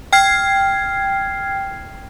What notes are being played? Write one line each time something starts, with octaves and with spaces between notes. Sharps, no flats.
G5 F6 G#6 C7